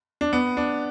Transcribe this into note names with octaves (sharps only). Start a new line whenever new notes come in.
D4
B3
D4